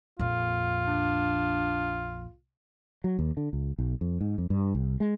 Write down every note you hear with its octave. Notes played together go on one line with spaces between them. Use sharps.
A#1 F2 F4
D4
F#3
D#2
D3
C#2
B1
F2
G#2
F2
G2
C2
G#3